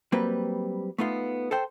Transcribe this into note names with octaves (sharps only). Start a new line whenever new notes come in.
F#3 G3 A#3 C4 B4
A3 B3 D#4 F4
A4 C5 G5